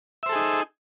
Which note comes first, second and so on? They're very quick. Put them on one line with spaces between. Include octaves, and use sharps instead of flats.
E5 C5 A4 G#4 D#4